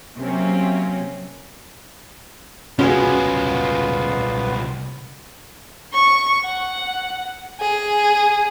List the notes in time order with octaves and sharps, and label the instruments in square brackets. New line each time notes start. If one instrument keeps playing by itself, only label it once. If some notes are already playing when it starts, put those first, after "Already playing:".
[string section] C3 F#3 A#3 C4 C#4
[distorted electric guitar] C2 G#3 [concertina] B3 F4 [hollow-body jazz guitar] C#4 F#4 G#4
[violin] C#6
F#5
G#4